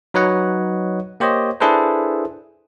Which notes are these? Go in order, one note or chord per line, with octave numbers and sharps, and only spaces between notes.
F#3 D#4 B4 C#5 D#5 F#5
A#3 G4 C5 C#5 D#5
D4 E4 G#4 A4 B4 C5